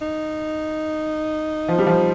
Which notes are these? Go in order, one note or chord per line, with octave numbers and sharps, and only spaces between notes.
D#4
F3
G3
F3